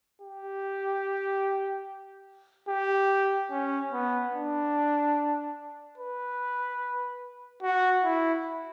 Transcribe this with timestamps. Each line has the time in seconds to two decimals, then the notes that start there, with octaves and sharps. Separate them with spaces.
0.22 G4
2.69 G4
3.51 C#4
3.93 B3
4.34 D4
5.98 B4
7.63 F#4
8.04 E4